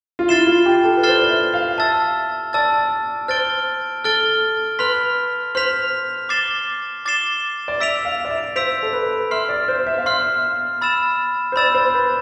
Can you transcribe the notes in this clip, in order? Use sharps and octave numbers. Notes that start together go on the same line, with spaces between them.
F4
E4 F6 A6 C7 E7 G7
F4
G4
A4
B4
C5 F6 A6 C7 E7 G7
D5
E5
F5
E5 A5 E6 A6
D5 A5 E6 A6
C5 F6 A6 D7 G7
A4 F6 A6 D7 G7
B4 C6 F6 B6 F7
C5 C6 F6 B6 F7
D6 A6 C7 E7 G7
D6 A6 C7 E7 G7
D5
E5 E6 B6 D7 F7
F5
D5
E5
C5 E6 B6 D7 F7
A4
B4
E5 C6 F6 C7
D5
C5
E5
F5
E5 C6 F6 C7
B5 E6 A6 E7
C5
D5 B5 E6 A6 E7
C5
B4